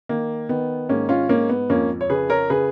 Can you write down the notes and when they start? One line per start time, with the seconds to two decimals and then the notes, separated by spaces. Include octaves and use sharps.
0.09 D#3 A#3
0.49 D#3 B3
0.89 G#2 A#3 C#4
1.09 C#4 F4
1.29 G#2 A#3 C#4
1.49 B3
1.70 F2 A#3 C#4
2.01 C#5
2.10 C#3 G#4 B4
2.30 A#4 C#5
2.50 C#3 G#4 B4